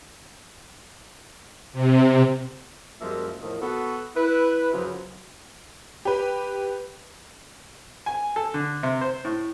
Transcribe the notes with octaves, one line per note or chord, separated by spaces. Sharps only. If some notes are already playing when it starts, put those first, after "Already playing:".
C3
F#2 F3 G3 G#3 A#3 E5
E2 A2 D#3 F3
B3 F#4 A4
E4 B4
F#2 C#3 F3 F#3
G4 B4
G#5
A4
D3
C3
C5
A2